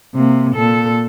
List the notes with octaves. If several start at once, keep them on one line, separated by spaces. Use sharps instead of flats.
C3 A#3
A#2 A4